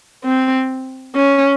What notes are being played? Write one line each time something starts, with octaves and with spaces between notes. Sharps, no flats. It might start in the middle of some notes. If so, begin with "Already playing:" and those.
C4
C#4